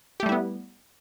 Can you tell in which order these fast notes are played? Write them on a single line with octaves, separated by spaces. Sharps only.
G4 A3 G3 E4 B3